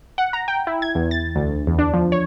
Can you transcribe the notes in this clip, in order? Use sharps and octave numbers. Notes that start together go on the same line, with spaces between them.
F#5
A#5
G5
E4
G#6
E2
A6
D2
E2
D4
F3
C#5